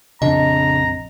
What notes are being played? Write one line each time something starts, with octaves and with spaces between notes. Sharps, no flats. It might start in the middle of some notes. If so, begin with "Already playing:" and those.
A#1 F2 C#3 C4 D4 D#5 A#5